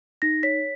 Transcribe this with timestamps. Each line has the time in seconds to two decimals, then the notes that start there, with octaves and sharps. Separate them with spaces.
0.22 D#4 A#6
0.43 C#5 B6